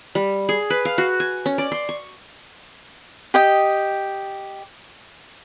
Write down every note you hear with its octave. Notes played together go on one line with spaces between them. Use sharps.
G3
G#4
B4
F5
F#4
G#5
C#4
D5
C6
C#6
G4 D#5 G5